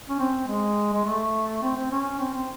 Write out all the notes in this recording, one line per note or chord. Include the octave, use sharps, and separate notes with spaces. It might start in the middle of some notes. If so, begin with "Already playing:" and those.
C#4
C4
G#3
G#3
A3
C4
C4
C#4
C4
C4